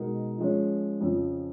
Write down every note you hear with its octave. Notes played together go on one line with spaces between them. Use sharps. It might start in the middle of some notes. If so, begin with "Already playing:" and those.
Already playing: B2 G#3 D#4 A#4
F3 G#3 C#4
F2 C#3 F3